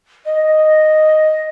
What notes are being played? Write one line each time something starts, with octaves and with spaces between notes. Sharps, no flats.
D#5